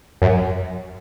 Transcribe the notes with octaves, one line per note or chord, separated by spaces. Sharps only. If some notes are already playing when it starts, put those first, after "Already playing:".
F#2